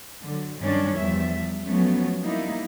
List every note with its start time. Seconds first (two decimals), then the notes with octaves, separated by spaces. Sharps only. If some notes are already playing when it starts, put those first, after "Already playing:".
0.22 D3 F#3
0.61 G2 D#3 F#3 G3 C#4 D4
0.97 E2 F3 G3 E5
1.65 F3 F#3 A3 B3 C#4
2.24 G3 A#3 D#4 E4